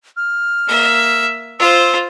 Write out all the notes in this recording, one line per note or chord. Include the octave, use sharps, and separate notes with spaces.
F6
A#3 E5
F4 C5 E6